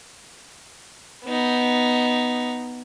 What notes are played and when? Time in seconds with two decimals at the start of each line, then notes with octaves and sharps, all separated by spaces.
1.25 B3 D#4